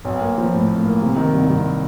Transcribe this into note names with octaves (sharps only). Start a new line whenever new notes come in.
B1
A#3
F3
A2
A2
A#3
C3
D#3
C2
C2